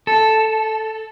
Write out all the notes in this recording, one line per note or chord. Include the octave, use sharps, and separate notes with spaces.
A4